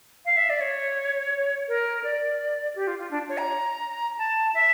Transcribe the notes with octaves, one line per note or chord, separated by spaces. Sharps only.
F5
E5
D5
C#5
A#4
D5
G4
F4
F4
D4
C#5
A#5
A5
E5